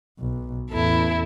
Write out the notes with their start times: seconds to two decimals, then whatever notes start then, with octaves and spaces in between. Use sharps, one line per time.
0.19 B1
0.71 A1 E2 E4 A4